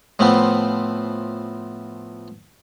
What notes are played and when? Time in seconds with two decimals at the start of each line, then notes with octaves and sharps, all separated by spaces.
0.19 A2 F3 A3 B3 C4